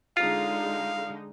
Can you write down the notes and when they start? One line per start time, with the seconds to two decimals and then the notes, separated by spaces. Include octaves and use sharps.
0.17 D3 G#3 D#4 F4 F5